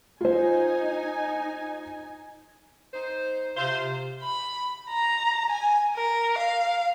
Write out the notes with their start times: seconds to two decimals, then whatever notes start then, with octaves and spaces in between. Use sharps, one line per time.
0.21 D#4 F4 C5 G#5
2.94 D#4 C5
3.57 C3 F4 G4 C5 F5
4.23 B5
4.90 A#5
5.50 G#5
5.96 A#4
6.38 F5